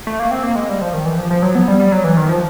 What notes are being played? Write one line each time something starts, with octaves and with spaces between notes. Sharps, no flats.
A3
A#3
C4
A#3
G#3
G3
F3
D#3
E3
F3
F3
F#3
B3
G3
G3
F#3
E3
D#3
F3